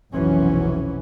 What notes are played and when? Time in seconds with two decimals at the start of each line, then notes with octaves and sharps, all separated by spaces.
0.13 F1 B1 E3 F#3 C#4